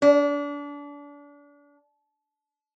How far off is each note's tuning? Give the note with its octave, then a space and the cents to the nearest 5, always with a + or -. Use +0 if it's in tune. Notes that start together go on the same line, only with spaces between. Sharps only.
D4 -30